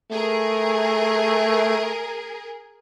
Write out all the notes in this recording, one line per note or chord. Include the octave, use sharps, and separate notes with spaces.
A3 G#4 A#4